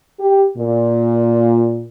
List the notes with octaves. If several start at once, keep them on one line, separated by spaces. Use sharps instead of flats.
G4
A#2